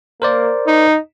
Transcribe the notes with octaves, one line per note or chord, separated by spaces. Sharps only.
A#3 A#4 C5 D5
D#4